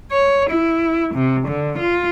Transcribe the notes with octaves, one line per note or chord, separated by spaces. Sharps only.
C#5
E4
C3
D3
F4